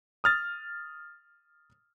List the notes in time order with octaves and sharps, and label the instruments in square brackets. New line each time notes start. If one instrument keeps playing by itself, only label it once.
[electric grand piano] D#6 F6 A6